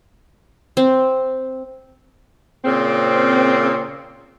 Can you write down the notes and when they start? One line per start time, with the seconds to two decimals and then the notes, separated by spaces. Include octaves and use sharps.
0.77 C4
2.65 A#2 C#3 C4